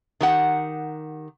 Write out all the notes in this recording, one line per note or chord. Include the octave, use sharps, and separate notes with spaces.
D#3 G4 F#5